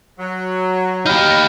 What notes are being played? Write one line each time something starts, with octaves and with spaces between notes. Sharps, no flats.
F#3
D#4 G4 B5 F6 G6